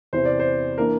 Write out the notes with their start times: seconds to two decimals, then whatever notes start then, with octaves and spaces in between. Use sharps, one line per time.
0.13 E2 C3 E3 C5
0.25 D5
0.39 C5
0.78 E3 A#3 D4 A#4